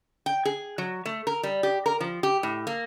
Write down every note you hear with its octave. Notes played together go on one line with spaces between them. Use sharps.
G5
G#4
F#3
A3
A#4
G3
G4
A#4
F3
G4
A2
A#3